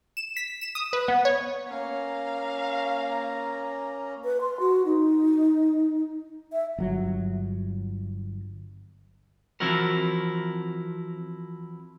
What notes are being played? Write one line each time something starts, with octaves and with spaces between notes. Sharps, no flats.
E7
B6
E7
D#6
B4
B3
C#5
A#3 C#4 F5 A#5
B4
C6
F#4
D#4
E5
G1 F#3
E3 F3 C4 E4 F#4 A#4